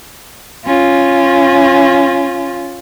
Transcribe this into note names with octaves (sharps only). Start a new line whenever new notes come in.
C#4 F4